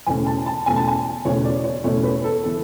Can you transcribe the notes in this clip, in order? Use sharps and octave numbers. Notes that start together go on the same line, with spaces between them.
E2 B2 A3 C#4 G#5
A5
A5
E2 B2 A3 C#4 G#5
A5
G#5
E2 B2 A3 C#4 C#5
D5
C#5
E2 B2 A3 C#4 C#5
B4
A4
E3 B3 A4